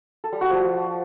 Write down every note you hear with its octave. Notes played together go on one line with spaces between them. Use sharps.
A4
G3
F#4
F3